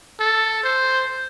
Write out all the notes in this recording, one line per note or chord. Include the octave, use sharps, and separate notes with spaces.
A4
C5